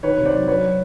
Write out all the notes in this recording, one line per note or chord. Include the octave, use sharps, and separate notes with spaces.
D#3 B4 C#5
C3
C5 D5
F#3
F#3 B4 C#5
F#3